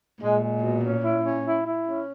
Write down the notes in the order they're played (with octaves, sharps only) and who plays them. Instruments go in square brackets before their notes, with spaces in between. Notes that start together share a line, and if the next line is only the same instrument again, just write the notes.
[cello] A#2 [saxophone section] G#3
[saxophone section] G#3
B2
C#4
E4
C#4
E4
E4
C#4